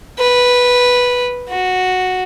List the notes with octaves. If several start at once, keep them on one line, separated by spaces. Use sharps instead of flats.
B4
F#4